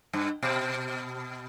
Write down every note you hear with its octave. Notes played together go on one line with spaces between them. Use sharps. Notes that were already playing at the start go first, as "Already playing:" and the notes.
G2
B2